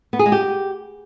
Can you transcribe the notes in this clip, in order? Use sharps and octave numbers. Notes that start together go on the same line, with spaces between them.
B3
G#4
G#3
G4